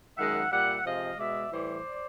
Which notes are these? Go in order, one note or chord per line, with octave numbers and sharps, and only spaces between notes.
F#2 D#3 G#3 E5 F#5
A#2 G3 E5 F#5
C3 F3 G#3 D#5 F5
B2 G#3 D5 E5
A2 E3 G3 C5 D5